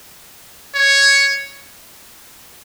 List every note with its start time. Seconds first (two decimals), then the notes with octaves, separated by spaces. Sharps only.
0.75 C#5